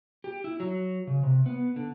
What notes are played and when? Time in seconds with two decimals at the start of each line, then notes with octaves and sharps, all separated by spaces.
0.24 G4
0.44 E4
0.60 F#3
1.07 C#3
1.23 C3
1.46 B3
1.76 D3